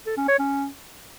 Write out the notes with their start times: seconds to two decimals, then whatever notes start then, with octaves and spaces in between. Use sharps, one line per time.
0.06 A4
0.17 C#4
0.28 C#5
0.39 C#4